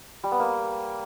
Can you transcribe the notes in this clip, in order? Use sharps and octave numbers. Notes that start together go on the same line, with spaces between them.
G3
B3
A#3